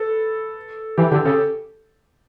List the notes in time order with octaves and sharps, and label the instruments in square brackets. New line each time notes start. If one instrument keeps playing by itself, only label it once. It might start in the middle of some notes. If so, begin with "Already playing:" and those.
Already playing: [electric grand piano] A4 B4
[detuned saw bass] E3 [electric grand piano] G4
[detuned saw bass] D3 [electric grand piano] G4
[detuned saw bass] C#3 [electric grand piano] A4